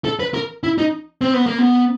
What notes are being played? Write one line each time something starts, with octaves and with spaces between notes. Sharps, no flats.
A4
B4
A#4
E4
D#4
C4
B3
A#3
B3